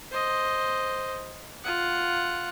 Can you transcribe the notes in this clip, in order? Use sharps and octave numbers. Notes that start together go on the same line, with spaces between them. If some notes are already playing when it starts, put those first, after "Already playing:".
C5 D#5
F4 F#5